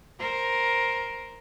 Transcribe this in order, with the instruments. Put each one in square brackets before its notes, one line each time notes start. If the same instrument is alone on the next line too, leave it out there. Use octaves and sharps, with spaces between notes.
[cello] A#4 C5